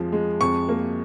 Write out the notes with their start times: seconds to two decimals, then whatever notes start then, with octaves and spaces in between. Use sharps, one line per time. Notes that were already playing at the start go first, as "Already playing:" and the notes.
Already playing: F2 F3 G#3
0.12 G#3
0.41 F2 C#6
0.69 A#3